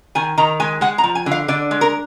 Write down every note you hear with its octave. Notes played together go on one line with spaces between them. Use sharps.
D#3 G#5
D#3 A#5
G#3 G#5
G#3 F#5
A#5
F3
G#5
D3
F5
D3 D5
G#3
A#4